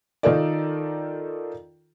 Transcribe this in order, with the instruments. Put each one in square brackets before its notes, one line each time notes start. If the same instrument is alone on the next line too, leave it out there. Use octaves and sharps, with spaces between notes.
[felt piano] D#3 D#4 F4 A4 A#4 D5